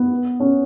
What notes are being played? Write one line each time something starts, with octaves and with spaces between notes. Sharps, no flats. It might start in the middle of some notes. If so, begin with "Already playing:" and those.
Already playing: B3
C#4